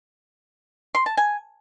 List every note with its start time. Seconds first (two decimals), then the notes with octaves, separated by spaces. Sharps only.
0.95 C6
1.06 A5
1.17 G#5